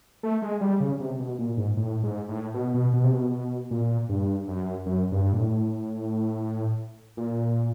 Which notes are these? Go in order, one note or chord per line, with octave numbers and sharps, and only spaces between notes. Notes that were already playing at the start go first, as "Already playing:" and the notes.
A3
G#3
G3
C#3
C3
B2
A#2
G#2
A2
G#2
A2
B2
B2
B2
C3
B2
B2
A#2
G2
F#2
F#2
G2
A#2
A2
A#2